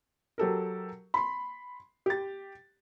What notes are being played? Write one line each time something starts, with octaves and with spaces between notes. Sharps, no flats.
F#3 G4 A4 A#4
B5 C6
G4 A6